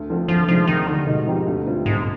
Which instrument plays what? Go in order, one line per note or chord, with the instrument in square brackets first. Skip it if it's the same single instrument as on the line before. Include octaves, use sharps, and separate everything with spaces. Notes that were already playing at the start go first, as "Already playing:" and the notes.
Already playing: [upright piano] D2
D3 F3 C4
[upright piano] D2 [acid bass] F3
[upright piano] C3 D#3 G#3 D4 [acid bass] F3
[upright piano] D#2 [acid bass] D#3
[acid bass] D3 [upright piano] D#3 G3
[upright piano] G#2 [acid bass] B2
[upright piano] F3 C4 D#4 G4
D2
D3 G3 C4 F4
[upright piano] B1 [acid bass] G#2